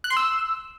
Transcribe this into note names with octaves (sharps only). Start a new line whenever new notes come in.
F#6
C6
E6